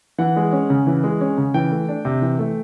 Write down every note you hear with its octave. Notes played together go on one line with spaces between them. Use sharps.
E3 F#5
G#3
C#4
C#3
E3
G#3
C#4
C#3
E3 G5
A3
D4
C3
E3
A3